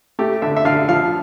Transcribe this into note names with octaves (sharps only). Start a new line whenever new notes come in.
A3 G4
D3 E5
E5
D3 F5
F3 F5